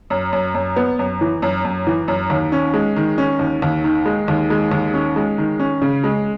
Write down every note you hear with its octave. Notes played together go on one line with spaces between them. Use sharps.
F#2
F#2
F#2
B3
F#2
E3
F#2
F#2
E3
F#2
D#2
C#4
G#3
D#3
C#4
D#2
D#2
D#3
G#3
D#2
G#3
D#2
C#4
G#3
D#3
C#4
C#3
G#3